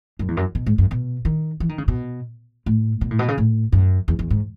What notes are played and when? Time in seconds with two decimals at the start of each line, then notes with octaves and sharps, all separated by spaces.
0.19 F#2
0.28 E2
0.37 F#2
0.55 B2
0.66 G#2
0.78 F#2
0.91 B2
1.25 D#3
1.60 E3
1.69 D#3
1.78 C#3
1.88 B2
2.66 A2
3.01 B2
3.11 A2
3.19 B2
3.28 C#3
3.38 A2
3.72 F#2
4.08 E2
4.19 E2
4.30 G#2